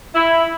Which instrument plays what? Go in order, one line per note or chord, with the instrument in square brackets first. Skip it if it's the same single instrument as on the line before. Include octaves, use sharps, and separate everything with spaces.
[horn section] E4